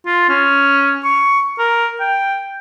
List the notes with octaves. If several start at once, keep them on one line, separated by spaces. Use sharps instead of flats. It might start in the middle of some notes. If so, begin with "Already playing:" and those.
F4
C#4
C#6
A#4
G5